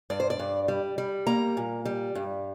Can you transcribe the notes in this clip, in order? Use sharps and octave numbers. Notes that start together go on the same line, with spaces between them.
G2 D5
C5
D5
G2
G3
G3
A#3 A#5
A#2
G3
G2